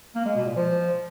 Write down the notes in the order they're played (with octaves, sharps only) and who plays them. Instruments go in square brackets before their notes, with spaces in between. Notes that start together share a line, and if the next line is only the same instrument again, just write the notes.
[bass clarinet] A#3
G#3
B2
A#2
F3